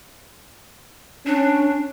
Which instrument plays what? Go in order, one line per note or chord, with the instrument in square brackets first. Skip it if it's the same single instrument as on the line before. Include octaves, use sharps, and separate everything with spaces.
[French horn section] C#4 [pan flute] D4